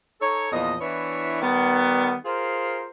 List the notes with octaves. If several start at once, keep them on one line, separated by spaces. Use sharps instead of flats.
D#4 A4 C#5
E2 A#2 F3 D#5
E3 B3 D4 E4 C#5
D#3 G3 B3
F4 G#4 A#4 C5